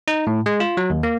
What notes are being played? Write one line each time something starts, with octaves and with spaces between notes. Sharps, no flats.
D#4
A2
G#3
F4
F#3
D#2
A#3